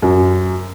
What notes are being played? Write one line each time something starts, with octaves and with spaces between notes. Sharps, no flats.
F#2